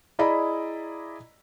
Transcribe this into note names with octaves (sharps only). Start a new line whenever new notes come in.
E4 G#4 D5 D#5 A#5 B5